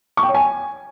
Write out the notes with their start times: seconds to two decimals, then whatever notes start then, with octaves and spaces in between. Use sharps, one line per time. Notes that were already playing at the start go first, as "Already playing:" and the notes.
0.17 C#6
0.23 G5
0.29 C#5
0.35 G#5